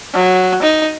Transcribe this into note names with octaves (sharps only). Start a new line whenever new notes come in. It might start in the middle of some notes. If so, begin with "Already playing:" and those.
F#3
D#4